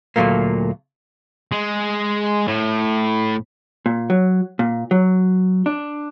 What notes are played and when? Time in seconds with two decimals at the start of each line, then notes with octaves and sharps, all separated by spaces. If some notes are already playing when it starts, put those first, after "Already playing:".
0.16 D2 A#2 D#3 F#3 A3 A#3
1.52 G#3
2.47 A2
3.86 A#2
4.10 F#3
4.59 A#2
4.91 F#3
5.66 D4